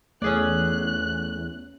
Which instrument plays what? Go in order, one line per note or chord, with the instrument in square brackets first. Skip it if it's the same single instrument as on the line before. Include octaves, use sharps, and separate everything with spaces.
[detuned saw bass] E2 [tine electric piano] A3 [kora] C#4 G#4 D5 [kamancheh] F#6